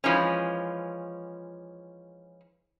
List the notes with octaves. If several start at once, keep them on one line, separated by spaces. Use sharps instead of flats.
E3 F3 G#3 C#4